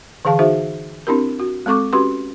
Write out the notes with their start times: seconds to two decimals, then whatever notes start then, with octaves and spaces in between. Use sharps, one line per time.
0.25 D3 E3 G#4 F5 A5
0.39 D#4 F#4 G#4 C5 E5
1.07 C4 D4 E4 G4 A#4
1.40 F#4
1.66 G#3 C4 A4 C#6 D6
1.93 C#4 F#4 G4 B4 C6